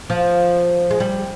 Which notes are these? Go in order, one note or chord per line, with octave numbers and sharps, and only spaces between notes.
F3
G#3
G3